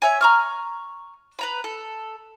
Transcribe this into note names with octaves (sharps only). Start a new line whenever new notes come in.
C#5 E5 G#5
A#5 C#6 F6
B4 A#5 B5
A4